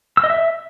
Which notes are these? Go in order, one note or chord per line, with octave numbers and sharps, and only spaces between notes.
E6
D#5
E5